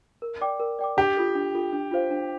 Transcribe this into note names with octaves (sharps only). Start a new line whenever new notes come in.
A#4
D5 G5 D6
A#4
D5 G5 D6
D4 G4
F4 A4
D4
F4 A4
D4
F4 C5 F5
D4